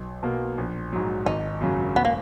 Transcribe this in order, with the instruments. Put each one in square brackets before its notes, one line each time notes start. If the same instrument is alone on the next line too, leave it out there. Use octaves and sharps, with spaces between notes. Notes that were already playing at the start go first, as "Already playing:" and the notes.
Already playing: [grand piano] B1
B2 A#3
A#1
G#2 F#3
[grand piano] G#1 [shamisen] D#4
[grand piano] F#2 C#3 F#3
[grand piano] E1 [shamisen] B3
[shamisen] A#3